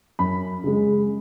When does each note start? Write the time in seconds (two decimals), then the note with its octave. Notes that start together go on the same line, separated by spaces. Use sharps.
0.19 F#2 B5
0.64 C#3 G#3